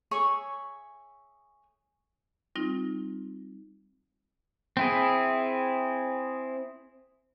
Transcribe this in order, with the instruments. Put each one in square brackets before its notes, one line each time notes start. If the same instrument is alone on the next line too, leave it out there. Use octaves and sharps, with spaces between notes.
[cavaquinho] G#4 C#5 E5 C#6
[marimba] G3 C4 D#4 F4
[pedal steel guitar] C4 E4 G#4